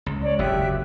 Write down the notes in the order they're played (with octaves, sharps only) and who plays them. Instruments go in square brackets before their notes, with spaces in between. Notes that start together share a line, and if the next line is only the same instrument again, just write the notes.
[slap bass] C#2
[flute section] C#5 D5
[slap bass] F#1 D#2 C3 [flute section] G4 E5 F#6